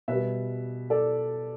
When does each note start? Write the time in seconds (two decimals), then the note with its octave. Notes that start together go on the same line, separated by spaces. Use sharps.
0.08 B2 G3 B4 E5
0.90 A4 D5